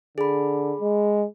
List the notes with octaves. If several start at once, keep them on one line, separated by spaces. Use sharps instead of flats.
D3 G#4 B5
G#3